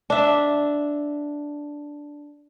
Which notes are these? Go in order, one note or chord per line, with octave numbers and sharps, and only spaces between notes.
D4 E5